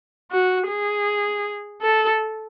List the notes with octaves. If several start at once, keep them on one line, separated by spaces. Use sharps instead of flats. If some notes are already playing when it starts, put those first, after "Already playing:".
F#4
G#4
A4